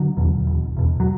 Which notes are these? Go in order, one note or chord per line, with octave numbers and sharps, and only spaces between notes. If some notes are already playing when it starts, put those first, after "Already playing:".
Already playing: D3 F#3
E2 B2
E1
E2 B2
F#3